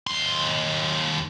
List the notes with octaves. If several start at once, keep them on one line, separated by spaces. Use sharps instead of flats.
D#2 C6